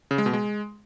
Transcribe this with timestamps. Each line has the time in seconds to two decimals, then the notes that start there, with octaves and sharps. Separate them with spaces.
0.11 C#3
0.18 G#3
0.26 B2
0.33 G#3